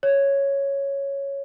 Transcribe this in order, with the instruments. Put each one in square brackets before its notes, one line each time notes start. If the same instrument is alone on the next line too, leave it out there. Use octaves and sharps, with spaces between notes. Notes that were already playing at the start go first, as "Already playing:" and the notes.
[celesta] C#5